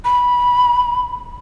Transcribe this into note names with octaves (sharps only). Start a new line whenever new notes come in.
B5